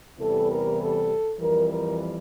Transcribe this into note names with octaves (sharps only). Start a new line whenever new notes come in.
E2 C3 E3 G3 A4
A#4
A4
F2 E3 G3 A#4
A#4